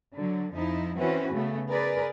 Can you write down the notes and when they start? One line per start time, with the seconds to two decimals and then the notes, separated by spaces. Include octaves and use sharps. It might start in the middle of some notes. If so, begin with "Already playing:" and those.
0.15 D3 F#3
0.54 F2 F3 D#4 E4
0.98 E3 C4 C#4 F#4 B4
1.33 C#3 A3 B3
1.70 G#4 A#4 B4 D5